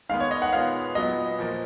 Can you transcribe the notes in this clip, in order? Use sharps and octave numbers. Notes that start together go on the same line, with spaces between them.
D#3 G#3 B3 F5
C#5
D#5
F#5
A#2 G#3 B3 F5
A#2 F#3 B3 D#5
A#2 F3 A#3